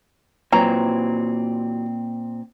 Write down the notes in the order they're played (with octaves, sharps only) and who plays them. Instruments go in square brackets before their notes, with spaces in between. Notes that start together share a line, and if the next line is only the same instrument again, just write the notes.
[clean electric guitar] A#2 C4 [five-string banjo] E3 F#3 A#5